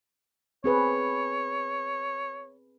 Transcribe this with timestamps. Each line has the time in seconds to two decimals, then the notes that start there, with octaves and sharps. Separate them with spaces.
0.64 C4 G#4 B4 C#5